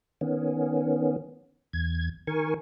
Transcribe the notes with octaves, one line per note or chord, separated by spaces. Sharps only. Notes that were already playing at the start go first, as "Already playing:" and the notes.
D#3 B3 C#4
E2 G#6
D#3 A#4 G#5 C#6